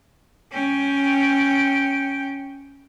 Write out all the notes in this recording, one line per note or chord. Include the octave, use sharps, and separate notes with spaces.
C#4 G5